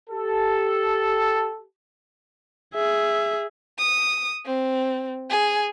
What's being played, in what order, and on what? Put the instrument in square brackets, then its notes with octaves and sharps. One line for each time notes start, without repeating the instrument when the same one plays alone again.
[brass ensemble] G4 A4
[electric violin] G#4 E5
[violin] D#6
C4
G#4